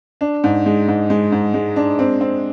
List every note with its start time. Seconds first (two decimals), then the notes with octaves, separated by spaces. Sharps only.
0.21 D4
0.44 G#2
0.66 G#3
0.88 G#2
1.10 G#3
1.32 G#2
1.54 G#3
1.76 D4
1.99 C4
2.21 C4